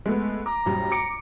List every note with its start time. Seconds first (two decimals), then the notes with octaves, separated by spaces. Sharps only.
0.06 G#3 A3 B3
0.46 A#5 D6
0.66 A#1 F#2 G3
0.92 D6 C#7 D7